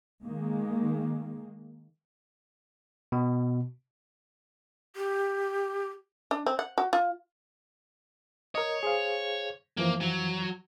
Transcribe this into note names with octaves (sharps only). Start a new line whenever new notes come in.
D#3 G#3 A#3
B2
G4
D4
C4
F#5
F#4
F4
A#4 C#5 D#5
G#4 C5 F5
F#2 E3 F3 A#3
F#3